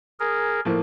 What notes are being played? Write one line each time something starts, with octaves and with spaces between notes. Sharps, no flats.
G#4 A#4
A2 F3 A#3